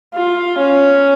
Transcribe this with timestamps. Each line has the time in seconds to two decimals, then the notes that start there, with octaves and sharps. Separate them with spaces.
0.14 F4
0.58 C#4